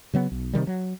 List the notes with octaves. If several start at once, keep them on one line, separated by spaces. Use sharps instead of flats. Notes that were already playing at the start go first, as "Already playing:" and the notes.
C#3 F#3 B3
B1
C3 D#3 G3
F#3